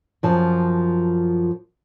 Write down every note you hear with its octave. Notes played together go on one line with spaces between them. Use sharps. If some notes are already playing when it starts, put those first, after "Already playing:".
F#2 F3 A5